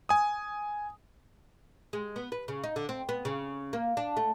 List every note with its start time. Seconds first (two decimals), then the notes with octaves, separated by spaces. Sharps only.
0.09 G#5 D#6
1.93 G#3
2.16 B3
2.32 B4
2.48 C#3
2.64 D#4
2.76 D3
2.89 C4
3.09 B3
3.25 C#3
3.73 A#3
3.97 D4
4.17 A3